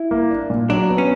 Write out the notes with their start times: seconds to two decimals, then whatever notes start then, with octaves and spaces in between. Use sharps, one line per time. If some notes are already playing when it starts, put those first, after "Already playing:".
Already playing: E4
0.11 A#3
0.31 D4
0.50 A#2
0.69 F#3 D4
0.89 B3
0.98 C#4